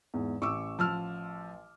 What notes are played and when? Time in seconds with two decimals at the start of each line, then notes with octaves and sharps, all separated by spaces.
0.14 E2 G#2
0.42 A1 C#6 D6 E6
0.79 F3 E6 F6